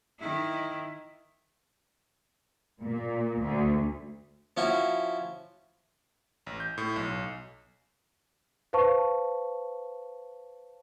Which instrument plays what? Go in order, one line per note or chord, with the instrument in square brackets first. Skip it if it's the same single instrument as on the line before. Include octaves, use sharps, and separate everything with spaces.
[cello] D#3 E4
[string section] A#2
D2
[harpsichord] F3 C#4 E4 F#4
[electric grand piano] A1
G6
A2
B1
[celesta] B4 C5 F5 A5 C#6